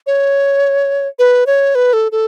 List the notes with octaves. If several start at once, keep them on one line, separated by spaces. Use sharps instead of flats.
C#5
B4
C#5
B4
A4
A4